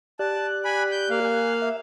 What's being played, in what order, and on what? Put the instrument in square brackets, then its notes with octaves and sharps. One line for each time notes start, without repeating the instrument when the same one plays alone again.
[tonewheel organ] G4 D5 F#6 [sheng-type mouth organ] A5
[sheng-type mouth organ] G#5 B5
G6
A#3 F5
[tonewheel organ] G#5 F#6
E5